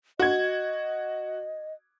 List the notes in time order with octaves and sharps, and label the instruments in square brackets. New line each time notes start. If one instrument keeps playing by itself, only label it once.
[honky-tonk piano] F#4 G#6 [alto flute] D#5